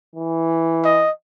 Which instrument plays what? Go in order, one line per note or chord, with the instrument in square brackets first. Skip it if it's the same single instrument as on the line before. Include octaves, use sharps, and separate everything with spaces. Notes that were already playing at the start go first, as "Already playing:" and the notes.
[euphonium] E3
[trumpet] D#5